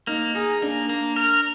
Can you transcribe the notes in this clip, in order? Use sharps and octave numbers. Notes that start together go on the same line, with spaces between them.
A#3 D#4
D#4 G#4
A#3 D4
A#3
A#4